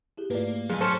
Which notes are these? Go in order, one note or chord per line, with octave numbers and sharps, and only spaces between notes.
E4 G4 G#4
G#2 A3 A#3 F4 B4 D5
F2 A2 F#3 G#4 G#5
C#4 A4 C5